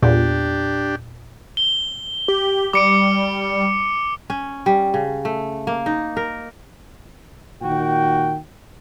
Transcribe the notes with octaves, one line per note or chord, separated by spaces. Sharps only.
E2 A#2 D4 G4
G7
G4
G3 D6 C#7 D7
C#4
G3
C#3
A3
A#3
D#4
A#4
A#2 D#3 F#4 G5